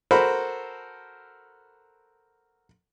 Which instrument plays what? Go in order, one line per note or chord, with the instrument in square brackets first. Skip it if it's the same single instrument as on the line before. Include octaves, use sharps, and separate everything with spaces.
[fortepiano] F#4 A4 A#4 C5 B5